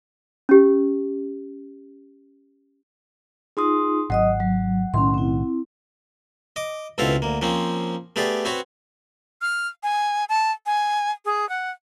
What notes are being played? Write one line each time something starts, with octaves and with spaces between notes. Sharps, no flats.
C#4 G4
D#4 F4 G#4 C6 D#6
G#1 F#3 D#5 F#5 D#6
F#3
B1 A2 D#3 C#4 C6
C4 E4
D#5 D6
C#2 B2 C4 E4 A4 F5
D2 A#3
F3 A#3 C4 C#4
A3 B3 G4 G#4 D5
C4 F#4 B4 C#5 B5
F6
G#5
A5
G#5
G#4
F#5